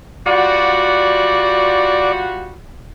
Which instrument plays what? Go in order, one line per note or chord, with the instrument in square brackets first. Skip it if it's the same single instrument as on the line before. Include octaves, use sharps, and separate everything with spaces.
[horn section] G3 F4 F#4 [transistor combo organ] D5